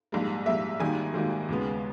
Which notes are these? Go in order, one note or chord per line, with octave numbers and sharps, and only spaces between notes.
A#1 G#2 G3 A#3
A#1 G#2 G3 A#3 E5
G#1 G#2 D#3 G3 A#3 G#5
G#1 G#2 D#3 G3 A#3
D#2 C#3 G#3 B3